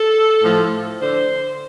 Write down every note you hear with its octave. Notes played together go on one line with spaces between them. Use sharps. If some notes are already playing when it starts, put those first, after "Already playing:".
Already playing: A4
A2 F3
D3 C5